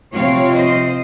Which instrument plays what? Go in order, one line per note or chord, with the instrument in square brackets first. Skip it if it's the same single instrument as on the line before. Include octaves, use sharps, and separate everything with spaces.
[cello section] C3 F3 C4 F4 C#5 F5
C5 D#5